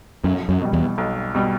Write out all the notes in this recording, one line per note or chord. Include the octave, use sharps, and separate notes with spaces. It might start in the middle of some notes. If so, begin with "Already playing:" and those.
B1 F#2
F#2
B2 G3
E2
B1
B2 G3